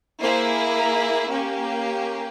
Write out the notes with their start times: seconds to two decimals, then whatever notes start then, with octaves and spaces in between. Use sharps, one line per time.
0.21 A#3 E4 G#4 C5
0.76 A#4
1.30 A#3 C#4 G4